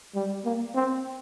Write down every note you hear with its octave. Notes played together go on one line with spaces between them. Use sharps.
G3
A#3
C4